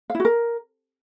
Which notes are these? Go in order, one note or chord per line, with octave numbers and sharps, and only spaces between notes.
F5
E4
F#4
A#4